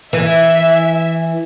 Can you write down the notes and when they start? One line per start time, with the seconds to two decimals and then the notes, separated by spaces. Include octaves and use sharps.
0.13 E3 E5